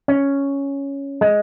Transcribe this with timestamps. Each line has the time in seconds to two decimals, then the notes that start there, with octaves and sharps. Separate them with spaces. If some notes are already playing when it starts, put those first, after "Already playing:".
0.08 C#4
1.21 G#3